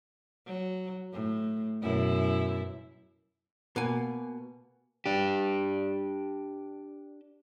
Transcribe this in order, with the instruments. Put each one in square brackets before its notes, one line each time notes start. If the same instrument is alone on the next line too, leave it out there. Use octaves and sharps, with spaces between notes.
[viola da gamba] F#3
A2
F#2 B2 E4
[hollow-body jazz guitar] B2 A#3 G#5
[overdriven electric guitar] D4 G4